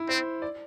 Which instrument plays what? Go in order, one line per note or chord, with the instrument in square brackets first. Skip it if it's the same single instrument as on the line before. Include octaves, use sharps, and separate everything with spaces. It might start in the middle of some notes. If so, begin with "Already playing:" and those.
Already playing: [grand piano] E4
[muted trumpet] C4 [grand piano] C5
[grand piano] D5